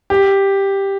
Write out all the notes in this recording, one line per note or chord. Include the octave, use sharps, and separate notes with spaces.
G4